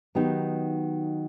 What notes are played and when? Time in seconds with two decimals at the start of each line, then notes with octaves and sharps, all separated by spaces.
0.15 D#3 F#3 B3 D#4 G4